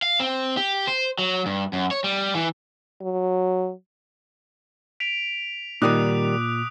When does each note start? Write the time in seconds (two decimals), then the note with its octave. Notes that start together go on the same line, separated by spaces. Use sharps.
0.02 F5
0.20 C4
0.57 G4
0.87 C5
1.19 F#3
1.46 G2
1.73 F#2
1.91 C#5
2.04 G3
2.35 E3
3.01 F#3
5.00 B6 D7 F7
5.82 A#2 D#3 G3 D#4 D6 D#6 F#6